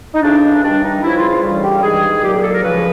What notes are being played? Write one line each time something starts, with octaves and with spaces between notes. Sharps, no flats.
D#4
D2 C#3 E3 D4
G2 D#3 G3 D4
D#4
C#2 C#3 F3 E4
F4
F4
D2 C#3 E3 G3
G4
G2 D#3 G#3 G#4
C2 A#2 F#3 G4
G#4
A4
A#4
C#2 C#3 F3 G#3 B4